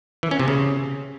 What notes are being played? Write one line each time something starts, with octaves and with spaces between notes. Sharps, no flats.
E3
C#4
C3
C#3